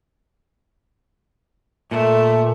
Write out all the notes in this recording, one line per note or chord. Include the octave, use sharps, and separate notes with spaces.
A#2 A3